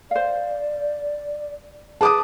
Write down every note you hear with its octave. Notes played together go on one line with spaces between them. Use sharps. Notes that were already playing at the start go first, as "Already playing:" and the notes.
C5 D5 F5
G#4 B4 A5 D6 D#6